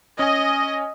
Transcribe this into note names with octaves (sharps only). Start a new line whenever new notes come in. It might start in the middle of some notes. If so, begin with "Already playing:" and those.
C#4 D#5 G#5